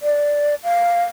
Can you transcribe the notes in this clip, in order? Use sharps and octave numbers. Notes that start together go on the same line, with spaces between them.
D5
F5